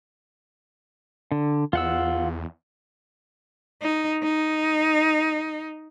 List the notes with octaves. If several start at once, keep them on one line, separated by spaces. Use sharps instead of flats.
D3
E2 F4 F#5 E6
D#4
D#4